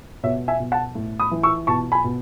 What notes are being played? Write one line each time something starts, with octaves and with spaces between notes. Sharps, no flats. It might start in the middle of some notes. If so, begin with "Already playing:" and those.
B2 C#5 E5
E5 G#5
B2
F#5 A5
A2
B5 D#6
E3
C#6 E6
B2 A5 C#6
G#5 B5
B2